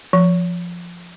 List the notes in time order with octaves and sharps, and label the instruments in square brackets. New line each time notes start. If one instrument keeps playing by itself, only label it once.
[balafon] F3